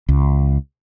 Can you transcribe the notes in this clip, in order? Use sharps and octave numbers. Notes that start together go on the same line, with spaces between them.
C#2